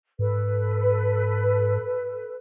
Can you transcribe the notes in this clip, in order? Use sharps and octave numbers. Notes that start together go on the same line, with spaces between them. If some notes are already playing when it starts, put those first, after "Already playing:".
G#2 A4 B4